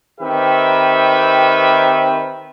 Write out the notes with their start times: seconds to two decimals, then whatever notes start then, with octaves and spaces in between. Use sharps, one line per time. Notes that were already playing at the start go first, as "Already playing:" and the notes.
0.21 D#3 C4 G4 B4 E5